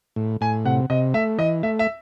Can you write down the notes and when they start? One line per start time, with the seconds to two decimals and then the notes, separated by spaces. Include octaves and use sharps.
0.16 A2
0.41 A2 G#5
0.65 C3 F#5
0.90 C3 D#5
1.14 A3 E5
1.38 E3 D#5
1.63 A3 E5
1.79 E5